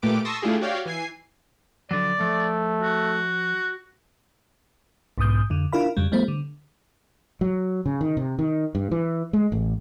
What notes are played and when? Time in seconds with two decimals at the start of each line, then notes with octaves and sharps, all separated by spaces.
0.02 A#2 A3 G4 B4 D6 D7
0.25 A5 C6 C#6 D#6 E6 A#6
0.42 A3 D4 E4 F4 G4 G#4
0.61 F#4 G4 C#5 D5 F5 G5
0.86 E3 G#5 C7
1.91 D3 F3 F#3 D5
2.21 F3 A3
2.82 F#4
5.18 B1 G#2 B2 D#6 G6
5.50 F2 D3
5.73 D4 E4 F4 A#4 F5 B5
5.97 F2 C#3 G3
6.12 F3 G3 A3 B3 C5
6.28 D3
7.41 F#3
7.86 C#3
8.01 D#3
8.17 C3
8.39 D#3
8.75 G2
8.91 E3
9.33 G#3
9.52 A1